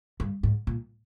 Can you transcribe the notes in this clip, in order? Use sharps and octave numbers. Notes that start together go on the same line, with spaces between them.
G2
G#2
A#2